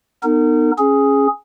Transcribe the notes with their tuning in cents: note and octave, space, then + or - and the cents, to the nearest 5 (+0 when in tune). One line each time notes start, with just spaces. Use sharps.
B3 +0 D#4 -25 A#4 -40
C#4 -15 G#4 +5